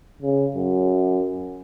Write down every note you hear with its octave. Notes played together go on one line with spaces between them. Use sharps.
C#3
F#2